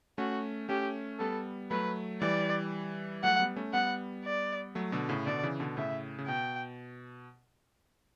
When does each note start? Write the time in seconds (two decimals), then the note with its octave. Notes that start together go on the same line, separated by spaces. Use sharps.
0.18 A3 C#4 F#4
0.69 A3 C#4 G4
1.19 G3 B3 A4
1.71 F#3 A3 B4
2.21 E3 G3 D5
3.24 F#3 A3 F#5
3.40 G3 B3
3.56 A3 C#4
3.74 G3 B3 F#5
4.25 D5
4.75 F#3 A3
4.92 B2 D3
5.09 A2 C#3
5.26 B2 D3 D5
5.43 C#3 E3
5.60 B2 D3
5.77 A2 C#3 E5
6.18 C#3
6.27 B2 G5